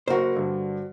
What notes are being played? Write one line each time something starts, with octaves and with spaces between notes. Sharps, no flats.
F#1 F#4 A#4 C5 F#5
G2 D3